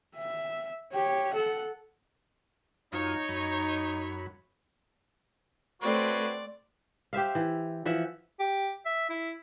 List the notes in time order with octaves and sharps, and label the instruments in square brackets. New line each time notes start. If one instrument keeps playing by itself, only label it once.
[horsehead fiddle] E5
G4 C#5
A4 F#5
[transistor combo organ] F#2 F4 [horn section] D#4 [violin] C#5
[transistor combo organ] F#2 B5
[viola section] A3 C4 C6 [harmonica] F#4 B4 C#5 [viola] D5
[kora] G4 C5 E5 F5
E3
E3 F3 E5 F#5
[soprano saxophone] G4
E5
E4